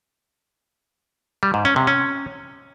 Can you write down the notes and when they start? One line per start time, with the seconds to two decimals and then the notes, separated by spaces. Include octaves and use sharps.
1.43 G3
1.54 G#2
1.65 C#4
1.76 C3
1.87 C#4